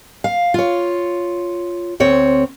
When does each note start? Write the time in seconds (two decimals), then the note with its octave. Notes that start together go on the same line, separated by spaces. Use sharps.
0.24 F5
0.54 F4 C#5
2.00 D2 C4 C#5